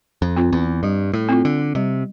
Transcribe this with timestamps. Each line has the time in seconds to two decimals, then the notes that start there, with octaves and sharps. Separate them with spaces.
0.22 F2
0.36 C4 F4
0.53 E2
0.83 G2 G3
1.13 A2
1.29 C4 F4
1.45 D3
1.75 C3 G3